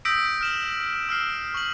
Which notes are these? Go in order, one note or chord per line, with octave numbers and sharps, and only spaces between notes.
D#6 E6 G6 A#6 B6 D7
F6 E7 F#7
E6 F6 C7 D7
C#6 F#7